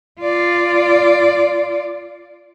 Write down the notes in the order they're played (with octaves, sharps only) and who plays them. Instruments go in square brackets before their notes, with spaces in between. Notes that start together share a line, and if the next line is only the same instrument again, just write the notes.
[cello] F4 D5